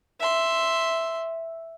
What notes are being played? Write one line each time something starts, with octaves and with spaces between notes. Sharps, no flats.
E5 C6